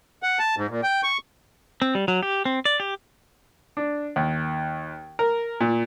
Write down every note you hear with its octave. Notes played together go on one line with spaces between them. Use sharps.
F#5
A5
G#2
A#2
G5
C#6
C4
G3
F#3
G4
C4
D5
G4
D4
D#2
A#4
A#2